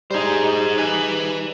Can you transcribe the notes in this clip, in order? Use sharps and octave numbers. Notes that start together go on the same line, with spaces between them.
G3 D#4 G#4 C5
B4 G#5